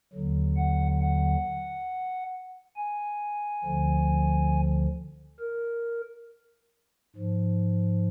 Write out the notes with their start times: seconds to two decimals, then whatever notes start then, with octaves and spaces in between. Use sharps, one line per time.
0.13 D#2 D3 F#3
0.57 F#5
1.01 F#5
2.77 G#5
3.64 D2 D3 F3
5.40 A#4
7.16 G#2 F3